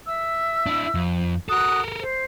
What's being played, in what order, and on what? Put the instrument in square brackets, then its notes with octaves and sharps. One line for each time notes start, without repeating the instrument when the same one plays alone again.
[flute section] E5 E6
[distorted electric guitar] D4 E4
F2
[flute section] F#4 D#6 F#6 [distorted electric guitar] A4 A#4
[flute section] C5